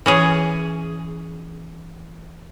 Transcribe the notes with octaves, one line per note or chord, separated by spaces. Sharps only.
E3 C#4 G#4